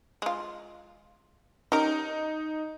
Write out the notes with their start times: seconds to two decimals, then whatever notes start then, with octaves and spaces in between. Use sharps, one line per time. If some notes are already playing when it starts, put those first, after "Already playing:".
0.22 G#3 F4
1.72 C#4 D#4 G4 A#4